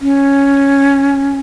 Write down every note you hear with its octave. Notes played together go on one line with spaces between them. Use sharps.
C#4